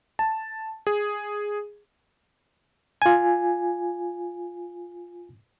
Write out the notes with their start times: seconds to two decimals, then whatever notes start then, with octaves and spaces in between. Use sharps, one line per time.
0.19 A5
0.87 G#4
3.02 F4 G#5